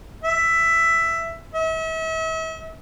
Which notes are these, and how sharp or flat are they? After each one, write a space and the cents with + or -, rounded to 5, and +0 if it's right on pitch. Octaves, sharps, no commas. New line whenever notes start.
E5 +10
E5 -40